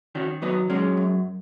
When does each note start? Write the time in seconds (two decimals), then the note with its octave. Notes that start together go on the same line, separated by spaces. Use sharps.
0.15 D#3 C#4 F#4
0.42 F#3 B3 D#4
0.70 F#3 G#3 C#4
0.97 F#2